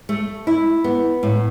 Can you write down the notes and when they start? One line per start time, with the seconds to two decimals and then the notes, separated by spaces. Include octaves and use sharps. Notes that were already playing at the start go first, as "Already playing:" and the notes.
0.09 A3
0.47 E4
0.84 B3
1.23 A2